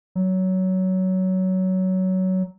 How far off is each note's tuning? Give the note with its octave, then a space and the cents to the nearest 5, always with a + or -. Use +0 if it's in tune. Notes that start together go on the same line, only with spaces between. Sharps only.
F#3 +15